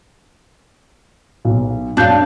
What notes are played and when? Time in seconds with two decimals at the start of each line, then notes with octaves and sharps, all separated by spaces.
1.45 B1
1.97 F#2 D4 F5 G6